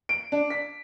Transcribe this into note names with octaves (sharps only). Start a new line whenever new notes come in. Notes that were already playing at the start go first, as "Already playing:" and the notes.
D7
D4
B6